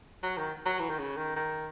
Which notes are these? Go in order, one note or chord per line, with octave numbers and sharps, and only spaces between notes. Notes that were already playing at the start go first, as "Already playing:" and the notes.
F#3
D#3
F#3
E3
D#3
C#3
D#3
D#3